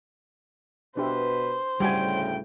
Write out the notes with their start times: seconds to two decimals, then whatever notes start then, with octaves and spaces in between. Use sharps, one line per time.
0.97 B2 D4 G4 B4 C5 E5
1.80 D2 A2 C#3 G3 F#4 G5 G#5